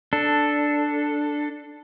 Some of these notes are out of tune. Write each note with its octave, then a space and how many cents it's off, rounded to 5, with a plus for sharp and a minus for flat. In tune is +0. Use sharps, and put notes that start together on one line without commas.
D4 +0 A4 +0